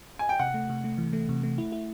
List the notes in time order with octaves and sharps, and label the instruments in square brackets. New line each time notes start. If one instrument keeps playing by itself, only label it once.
[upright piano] G#5
G5
[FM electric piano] C3 [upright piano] F#5
[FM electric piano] A3
C3
A3
E3
A3
C3
A3
E4
E4